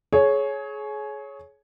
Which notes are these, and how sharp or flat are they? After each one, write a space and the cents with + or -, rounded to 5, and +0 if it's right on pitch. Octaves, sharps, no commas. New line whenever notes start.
G#4 +30 C#5 +0